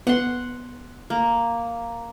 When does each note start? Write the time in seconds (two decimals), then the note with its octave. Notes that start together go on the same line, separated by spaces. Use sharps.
0.07 B3 F#5 C6
1.10 A#3